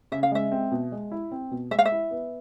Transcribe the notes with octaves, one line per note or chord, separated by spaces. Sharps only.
C#3 E5
F5
G#3 E5
C4
B2
G#3
E4
C4
B2
G#3 E5
F5
E5
E4
B3